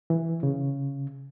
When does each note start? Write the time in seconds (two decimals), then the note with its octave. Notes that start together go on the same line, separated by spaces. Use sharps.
0.10 E3
0.43 C#3